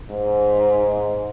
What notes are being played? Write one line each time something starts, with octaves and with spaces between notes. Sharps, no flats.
G#2